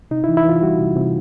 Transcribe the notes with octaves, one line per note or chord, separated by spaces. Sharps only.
C3 D#4
E4
E3
E4
E3 F4
G3 F#4
C3
C3